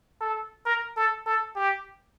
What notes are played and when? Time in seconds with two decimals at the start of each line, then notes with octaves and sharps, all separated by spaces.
0.20 A4
0.66 A#4
0.97 A4
1.26 A4
1.56 G4